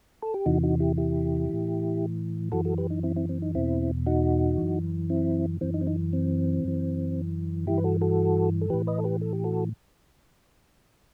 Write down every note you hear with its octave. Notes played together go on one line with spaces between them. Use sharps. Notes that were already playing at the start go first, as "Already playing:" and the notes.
A4
G4
E2 C3 E3 D#4 F#4
D#4 F#4
E4 G4
E4 G4
A2 E3
F#2 E3 F#4 A4
F#4 A4
G4 B4
D#4
C4 E4
C4 E4
C4
D#4
E2 B2 C4 E4
D#4 F#4
F#2 E3
C4 E4
F#2 E3 C4
D#4
C4
D#4
C4
F#2 E3
G2 E3 E4 G4
B4
F#4 A4
F#4 A4
A4
A2 E3 G4 B4
B4 D#5
A4
G4 B4
A4
G4
F#4 A4